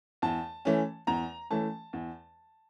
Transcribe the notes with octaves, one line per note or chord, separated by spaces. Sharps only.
E2 A5
E3 A3 C#4
E2 A#5
E3 A3 C#4 A5
E2